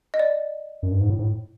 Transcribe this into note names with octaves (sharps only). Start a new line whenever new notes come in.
D#5
D5
F#2
G2
G#2
A2
G#2
A2